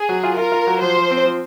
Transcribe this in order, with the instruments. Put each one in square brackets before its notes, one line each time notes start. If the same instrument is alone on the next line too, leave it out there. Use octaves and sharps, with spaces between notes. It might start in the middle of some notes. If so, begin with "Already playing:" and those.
Already playing: [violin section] G#4
[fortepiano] F#3
F4
[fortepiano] F4 [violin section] A#4
[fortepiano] F4
F#3
[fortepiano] F3 [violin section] C5
[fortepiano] F3
C4
F3